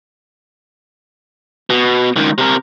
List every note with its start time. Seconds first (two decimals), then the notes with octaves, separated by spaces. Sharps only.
1.70 B2
2.16 C#2 D#3
2.38 C3 A#4